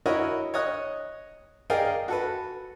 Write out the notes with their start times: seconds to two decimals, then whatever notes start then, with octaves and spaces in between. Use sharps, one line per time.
0.06 E4 F#4 A#4 C#5 D#5
0.54 C#5 D#5 D#6 F#6
1.70 G#4 A#4 D5 D#5 F5 G5
2.08 F#4 A4 B4